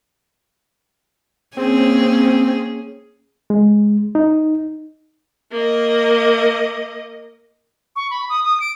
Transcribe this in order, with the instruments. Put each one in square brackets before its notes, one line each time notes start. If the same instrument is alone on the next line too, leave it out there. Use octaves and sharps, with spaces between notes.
[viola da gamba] A#3 C#4 G#4 [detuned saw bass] C4
[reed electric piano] G#3
D#4
[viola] A#3 D#5
[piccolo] C#6
B5
D#6
D#6
D7